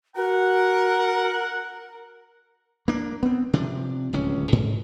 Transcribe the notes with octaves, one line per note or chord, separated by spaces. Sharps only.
F#4 A#4 F#5
A#3 D4
B3 C4
C3 F3 D4
D1 C#2 C#4
G#2